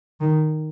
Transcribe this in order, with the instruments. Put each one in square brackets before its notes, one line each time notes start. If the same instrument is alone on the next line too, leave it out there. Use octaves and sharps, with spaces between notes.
[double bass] D#3